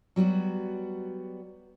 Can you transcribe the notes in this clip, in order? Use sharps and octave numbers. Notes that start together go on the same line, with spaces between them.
F#3 G3 B3 F#4